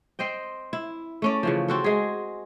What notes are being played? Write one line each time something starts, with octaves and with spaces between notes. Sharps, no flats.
C4 C5 D#5 G5
E4
A3 C#4 D5
C#3 E3 F3
C4 F#4 A4
G#3 G#4